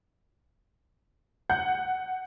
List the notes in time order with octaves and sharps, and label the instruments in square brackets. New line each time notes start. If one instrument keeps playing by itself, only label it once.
[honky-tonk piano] F#5 G6